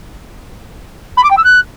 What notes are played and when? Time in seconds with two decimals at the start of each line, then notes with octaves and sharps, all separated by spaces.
1.17 B5
1.24 D6
1.30 G5
1.37 E6
1.44 F#6